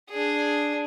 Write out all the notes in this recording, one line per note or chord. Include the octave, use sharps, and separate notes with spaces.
D4 G#4